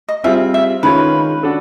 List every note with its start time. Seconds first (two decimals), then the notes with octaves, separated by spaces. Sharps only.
0.08 D#5
0.24 G3 C4 F4 G#4 E5
0.54 E5
0.83 D#3 G#3 C#4 F4 B4
1.43 D4 F#4 A4